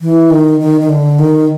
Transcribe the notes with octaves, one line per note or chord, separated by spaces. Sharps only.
E3
D#3
D#3
D#3
D3
D#3